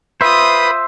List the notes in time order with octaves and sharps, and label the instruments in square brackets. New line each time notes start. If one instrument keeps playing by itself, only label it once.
[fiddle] F4 D#6 [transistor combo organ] B4 [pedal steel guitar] C5 E5